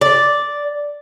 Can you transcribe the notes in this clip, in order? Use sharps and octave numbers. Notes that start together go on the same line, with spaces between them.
D5